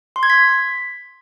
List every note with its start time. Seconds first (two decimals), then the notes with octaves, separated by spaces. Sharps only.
0.16 C6
0.23 G#6
0.30 B6